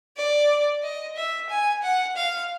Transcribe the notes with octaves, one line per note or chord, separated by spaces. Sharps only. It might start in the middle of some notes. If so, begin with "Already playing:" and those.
D5
D#5
E5
G#5
F#5
F5